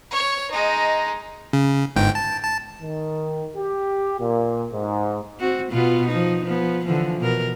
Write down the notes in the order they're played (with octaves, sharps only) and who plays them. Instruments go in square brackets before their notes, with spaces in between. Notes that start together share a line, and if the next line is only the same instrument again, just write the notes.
[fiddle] C#5
G#3 D#4
[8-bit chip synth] C#3
G1 G#2 G5
A5
A5
[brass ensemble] D#3
G4
A#2
G#2
[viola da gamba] C4 F#4
B2 B3 F4
F3 D#4
F3 B3
D3 E3 F3
B2 A#4